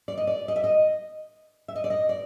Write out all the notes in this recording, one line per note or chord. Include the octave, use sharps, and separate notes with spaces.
D5
D#5
D5
D#5
E5
D#5
E5
D#5
D5
D#5
D5